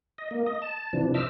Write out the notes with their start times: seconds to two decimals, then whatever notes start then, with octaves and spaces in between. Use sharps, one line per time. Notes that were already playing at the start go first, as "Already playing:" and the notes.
0.18 D#5
0.31 A#3
0.46 D#5
0.62 A5
0.93 C3 E3 F3 D4
1.14 C5 D#5 E5 D6 E6 F6